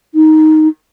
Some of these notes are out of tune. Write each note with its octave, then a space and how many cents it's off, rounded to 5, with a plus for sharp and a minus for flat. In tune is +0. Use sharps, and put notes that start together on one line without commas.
D#4 +5